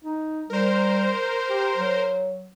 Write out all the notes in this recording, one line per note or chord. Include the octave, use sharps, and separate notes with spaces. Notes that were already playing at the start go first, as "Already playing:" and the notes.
D#4
G3 A#4 C5
G4
F#3